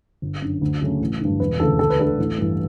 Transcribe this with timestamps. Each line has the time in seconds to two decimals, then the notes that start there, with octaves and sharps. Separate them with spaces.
0.22 G1
0.42 F#2 D3
0.61 D2
0.82 C#3 F#3 A3 C#4
1.01 A1
1.20 G2 D3
1.40 E1 B4
1.60 D2 C#3 E3 A4
1.79 D2 A4
1.90 B4
1.99 D3 A3 D4 A4
2.18 A1
2.38 G2 E3